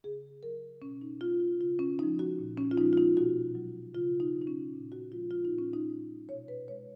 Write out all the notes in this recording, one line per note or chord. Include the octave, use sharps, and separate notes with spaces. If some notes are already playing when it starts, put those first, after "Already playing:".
C#3 G#4
F#3 A#4
B2 C#4
D#4
G#3 F4
F4
C#3 F4
C#4
F3 G#3 D#4
F#4
A#2
C#4
F4
F3 G#3 D#4
F4
D#4
B2 F#4
F#3
C#3 F4
D#4
F#3
D#4
C#4
A#2
F#4
F3 G#3 F4
F4
D#4
A#2
C#4
D#4
G#3
B2 C#5
B4
G#3 C#5